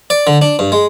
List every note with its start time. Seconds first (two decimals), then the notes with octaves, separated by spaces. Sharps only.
0.10 D5
0.27 D3
0.42 D4
0.59 G2
0.72 G#3